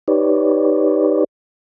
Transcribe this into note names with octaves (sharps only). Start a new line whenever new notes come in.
D#4 G4 B4 C#5 D5